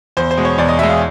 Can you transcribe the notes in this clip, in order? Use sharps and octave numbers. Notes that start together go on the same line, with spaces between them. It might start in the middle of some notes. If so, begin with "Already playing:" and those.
E2 C5
C5
B2 G#3
C#5
E2 D5
D#5
B2 G#3 E5
F5